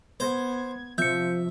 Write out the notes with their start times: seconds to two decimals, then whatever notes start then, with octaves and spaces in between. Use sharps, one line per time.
0.20 B3 C5 G#6
0.98 C3 F3 E5 G6 C#7